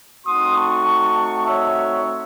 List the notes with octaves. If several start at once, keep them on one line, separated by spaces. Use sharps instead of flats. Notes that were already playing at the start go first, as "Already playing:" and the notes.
A3 C4 D#4 F#4 C6 D#6
A5 C#6
C#5 E5